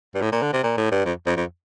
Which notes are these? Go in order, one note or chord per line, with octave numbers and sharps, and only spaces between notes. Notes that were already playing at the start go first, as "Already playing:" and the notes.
G2
A2
A#2
D3
C3
A#2
A2
G2
F2
F2
F2